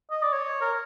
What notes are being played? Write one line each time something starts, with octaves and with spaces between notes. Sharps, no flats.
D#5
D5
C#5
A#4